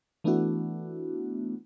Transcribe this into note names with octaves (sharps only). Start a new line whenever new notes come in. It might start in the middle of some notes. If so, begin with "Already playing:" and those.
E3 A3 B3 D4 E4 F#4